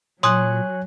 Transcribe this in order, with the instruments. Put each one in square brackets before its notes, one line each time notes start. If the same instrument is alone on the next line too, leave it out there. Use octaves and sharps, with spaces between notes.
[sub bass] A#2 [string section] F#3 [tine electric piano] C#5 G#5 F#6 [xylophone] C6 D#6